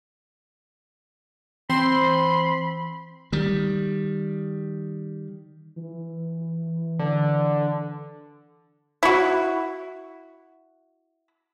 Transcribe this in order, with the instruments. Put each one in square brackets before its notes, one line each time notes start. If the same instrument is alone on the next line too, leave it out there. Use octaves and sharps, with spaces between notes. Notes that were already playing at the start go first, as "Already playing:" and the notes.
[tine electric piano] E3 [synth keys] C4 [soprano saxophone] B5 [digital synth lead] C6
[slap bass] D#3 G3
[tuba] E3
[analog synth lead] D3
[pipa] E4 F#4